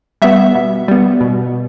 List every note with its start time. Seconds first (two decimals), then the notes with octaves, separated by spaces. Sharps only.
0.22 G3 B3 E5
0.55 B2
0.88 G3 B3
1.21 B2